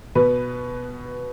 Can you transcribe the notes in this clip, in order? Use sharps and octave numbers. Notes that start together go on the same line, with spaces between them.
B2 B3 B4